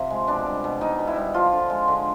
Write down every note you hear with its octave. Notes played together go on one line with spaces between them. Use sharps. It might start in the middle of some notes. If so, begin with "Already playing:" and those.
Already playing: C3 F3
G#3
B2 D4
G3
B2
B2 D#4
B2
E4
G3
F3 F4
D3
G#3
D3